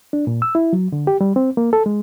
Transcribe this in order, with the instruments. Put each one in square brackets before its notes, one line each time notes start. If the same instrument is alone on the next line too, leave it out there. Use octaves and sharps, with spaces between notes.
[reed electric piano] D4
A#2
E6
E4
F#3
D3
G4
G3
C4
A#3
A4
G#3